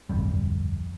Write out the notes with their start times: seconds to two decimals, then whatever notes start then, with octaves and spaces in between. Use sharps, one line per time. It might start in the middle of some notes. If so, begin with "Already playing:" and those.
0.09 D1 G1 F2 G3